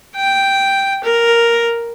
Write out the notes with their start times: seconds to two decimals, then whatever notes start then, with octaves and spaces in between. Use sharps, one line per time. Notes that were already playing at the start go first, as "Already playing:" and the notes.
0.16 G5
1.04 A#4